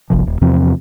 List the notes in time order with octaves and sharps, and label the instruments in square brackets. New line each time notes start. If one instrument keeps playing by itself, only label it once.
[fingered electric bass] F#1 B1 C3 F3
D#1
E2 C3 F3 C4